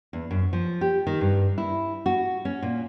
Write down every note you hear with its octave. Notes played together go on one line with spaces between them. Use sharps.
E2
F#2
F3
G4
D#3
G2
E4
F#4
C#4
A#2